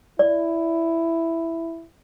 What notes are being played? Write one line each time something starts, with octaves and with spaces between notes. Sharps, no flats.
E4 D5